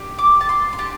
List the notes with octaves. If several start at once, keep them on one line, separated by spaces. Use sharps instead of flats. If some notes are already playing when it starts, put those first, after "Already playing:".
Already playing: D4 G4
D6
A5
C6
C6
D4 G4 A5